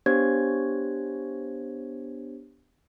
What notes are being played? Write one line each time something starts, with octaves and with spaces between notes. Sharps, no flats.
B3 D4 G4 C5 C#5 G#6